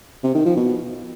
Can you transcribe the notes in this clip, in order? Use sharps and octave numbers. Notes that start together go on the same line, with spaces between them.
C3
D#3
F3
B2